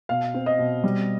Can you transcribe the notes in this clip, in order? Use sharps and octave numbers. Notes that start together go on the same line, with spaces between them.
B2 F5
C4
D#5
B2
G3